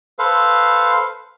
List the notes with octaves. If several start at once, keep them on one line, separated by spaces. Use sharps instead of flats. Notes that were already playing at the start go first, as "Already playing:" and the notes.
A4 B4 C5 F5